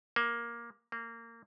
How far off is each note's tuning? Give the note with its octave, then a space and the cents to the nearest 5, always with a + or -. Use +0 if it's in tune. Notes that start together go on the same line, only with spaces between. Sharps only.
A#3 +10
A#3 -20